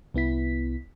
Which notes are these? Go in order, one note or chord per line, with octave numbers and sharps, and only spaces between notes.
C2 B3 E4 B6